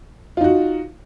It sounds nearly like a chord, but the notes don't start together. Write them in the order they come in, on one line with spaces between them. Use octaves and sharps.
F4 D#4 F#4